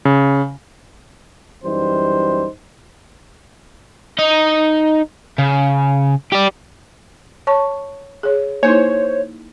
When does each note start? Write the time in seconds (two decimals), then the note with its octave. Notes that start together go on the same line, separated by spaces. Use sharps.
0.05 C#3
1.64 F#2 E3 G3 D#4 C5
4.19 D#4 D#5
5.38 C#3
6.32 G4 D5
7.47 C#5 A5 C#6
8.23 G#4 C#5
8.63 A#3 D#4 E4 C5 C#5